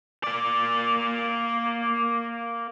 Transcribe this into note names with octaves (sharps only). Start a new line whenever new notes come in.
A#3 D5